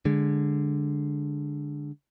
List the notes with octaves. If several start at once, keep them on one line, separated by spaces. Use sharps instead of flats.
D3 G#3